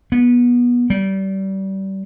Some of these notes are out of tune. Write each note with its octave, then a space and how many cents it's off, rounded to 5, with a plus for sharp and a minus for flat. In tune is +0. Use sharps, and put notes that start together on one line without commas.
B3 -25
G3 -25